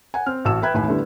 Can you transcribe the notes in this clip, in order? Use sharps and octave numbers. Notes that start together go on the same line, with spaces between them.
F#5 G#5
C4 F6
A1 F#4 A5 E6 E7
B4 E5 G5 B5 F#6 G#6
A1 D#2 A2 G#5 B5
D3 G3 A3 B3 E4